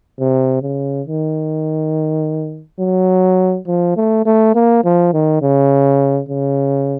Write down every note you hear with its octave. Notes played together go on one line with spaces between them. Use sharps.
C3
C#3
D#3
F#3
F3
A3
A3
A#3
F3
D#3
C#3
C#3